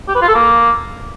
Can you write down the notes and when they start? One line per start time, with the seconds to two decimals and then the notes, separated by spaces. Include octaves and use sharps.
0.08 G4
0.15 B4
0.22 F4
0.28 A4
0.35 A#3